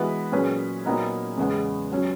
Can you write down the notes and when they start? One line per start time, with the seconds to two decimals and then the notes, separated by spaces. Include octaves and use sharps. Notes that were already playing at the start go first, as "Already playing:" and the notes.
Already playing: E3 G#3 B3 F#4 B4
0.32 A#2 F#3 C#4 G#4 B4
0.85 A#2 F#3 B3 D#4 A#4
1.38 E2 C#3 G#3 B3
1.92 F#3 C#4